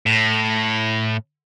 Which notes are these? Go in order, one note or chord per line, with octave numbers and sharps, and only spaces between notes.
A2